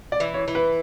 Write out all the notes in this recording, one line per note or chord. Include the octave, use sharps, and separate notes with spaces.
D5
E3
C#5
E3
B4